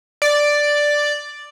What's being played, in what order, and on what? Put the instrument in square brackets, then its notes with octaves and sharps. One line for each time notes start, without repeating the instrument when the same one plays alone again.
[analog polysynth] D5